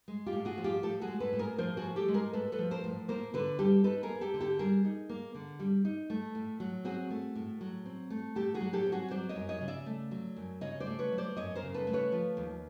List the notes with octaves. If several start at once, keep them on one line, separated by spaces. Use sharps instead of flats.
G#3
F4 G4
A2
F#4 G#4
F3
F4 G4
A2 G4 A4
F#4 G#4
G#3
A4 B4
A2
G#4 A#4
F3 A#4 C5
F#4 G#4
A2
G4 A4
G#3
G#4 A#4
A2 A4 B4
A4 B4
F3
A#4 C5
A2
A#3 A#4 C5
D3 A4 B4
G3 G4 A4
D#4 A4 B4
G#4 A#4
A#3
G4 A4
D3
G4 A4
G3 G#4 A#4
D#4
A#3
D3
G3
D#4
A3
A2
F#3
C4 F#4 G#4
A3
A2
F#3
C4
A3
A2 G4 A4
F#4 G#4
F#3
G4 A4
C4
F#4 G#4
F#3 C5 D5
C#5 D#5
F#2
C#5 D#5
C#3
D5 E5
A3
F#3
F#2
C#3 C#5 D#5
C5 D5
A3
B4 C#5
F#3
C5 D5
F#2 C#5 D#5
A#4 C5
C#3
A4 B4
A3
B4 C#5
F3
D#2